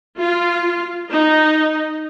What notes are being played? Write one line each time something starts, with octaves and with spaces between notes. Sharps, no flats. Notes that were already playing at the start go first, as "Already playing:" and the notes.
F4
D#4